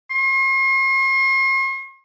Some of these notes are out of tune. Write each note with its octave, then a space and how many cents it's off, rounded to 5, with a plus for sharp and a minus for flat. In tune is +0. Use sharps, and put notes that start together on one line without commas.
C6 +45